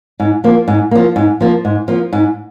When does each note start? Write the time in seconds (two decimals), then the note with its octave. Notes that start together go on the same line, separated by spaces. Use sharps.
0.20 G#2
0.44 F3 A#3
0.68 G#2
0.91 F3 A#3
1.16 G#2
1.41 F3 A#3
1.65 G#2
1.88 F3 A#3
2.13 G#2